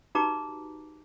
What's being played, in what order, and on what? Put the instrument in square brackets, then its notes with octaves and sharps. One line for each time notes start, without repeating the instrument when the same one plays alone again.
[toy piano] D#4 F#4 G4 B4 A#5 D6